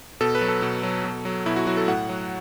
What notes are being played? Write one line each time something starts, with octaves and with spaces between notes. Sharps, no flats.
B2 A4
B4
F#3
A4
B2
F#3
B2
F#3
B2 E4
F#4
F#3 F#4
A4
A2 F#5
F#3